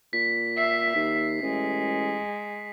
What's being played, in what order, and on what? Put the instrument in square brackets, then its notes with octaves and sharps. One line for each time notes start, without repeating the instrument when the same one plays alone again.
[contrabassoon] A#2 [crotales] B6
[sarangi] E5 [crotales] C7
[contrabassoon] D#2
[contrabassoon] A1 [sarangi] G#3